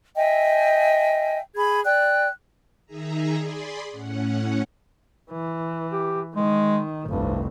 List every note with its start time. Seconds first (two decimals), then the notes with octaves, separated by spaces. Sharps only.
0.15 D#5 E5 G5 G#5
1.55 G#4 B5 G#6
1.85 D5 G5 F#6
2.86 D#3 D#4 G#4 E5 A#5
3.38 G#4 D5 B5 C6
3.91 A2 C#4 F#5
5.32 E3
5.92 G4
6.36 D#3 G#3
7.05 F1 C2 G2